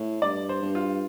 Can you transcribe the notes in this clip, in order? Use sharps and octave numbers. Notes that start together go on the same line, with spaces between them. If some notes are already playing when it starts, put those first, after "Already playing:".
Already playing: A2
G2 D5
C5
G2
F4